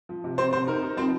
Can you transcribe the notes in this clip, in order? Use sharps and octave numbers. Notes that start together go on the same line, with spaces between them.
F3
C3
C3 C4 C5
C3 C4 C5
D#4 A#4
D#4
F3 C4 C5